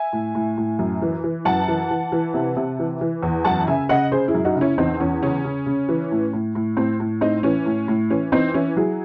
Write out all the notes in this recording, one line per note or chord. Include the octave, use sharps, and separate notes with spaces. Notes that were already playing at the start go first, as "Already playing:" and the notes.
Already playing: E5 G#5
A2
A2
A2
F#2
E3
E3
F#2 F#5 A5
E3
E3
E3
C3
C3
E3
E3
E2
F#2 F#5 A5
C#3 E5 G#5
C#3 D#5 F#5
C#3 G#4 C5
E4 G#4
F#2
D#4 F#4
C#3
C#4 E4
E2 C4 D#4
E2 C#4
C#3 C#4
C#3
C#3
E3
A2
A2
A2
A2 C4
A2
A2 C4 D#4
E3 C#4
A2
A2
E3 C#4
E3 C4 D#4
E3 C#4 E4
F#3 E4 G#4